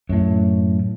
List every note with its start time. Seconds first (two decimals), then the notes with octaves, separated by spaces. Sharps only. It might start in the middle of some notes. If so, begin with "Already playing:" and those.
0.09 F#2 A2